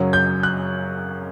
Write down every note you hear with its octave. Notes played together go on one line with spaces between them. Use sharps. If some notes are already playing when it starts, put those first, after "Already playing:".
Already playing: F#2 C#3 F#3 C#4
G6
F#6